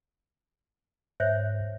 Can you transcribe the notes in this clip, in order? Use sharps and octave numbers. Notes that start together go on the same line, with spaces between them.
G#2 C5 C#5 E5